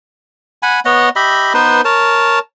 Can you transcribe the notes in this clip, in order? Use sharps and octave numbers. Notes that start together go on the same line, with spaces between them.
F#5 G#5 B5
B3 C#5 D#5 F#5
G4 D#5 E5 B5
B3 D#4 B4 C5
A#4 C#5 A5